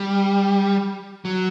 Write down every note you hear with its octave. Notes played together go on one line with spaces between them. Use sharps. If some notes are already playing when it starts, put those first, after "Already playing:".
Already playing: G3
F#3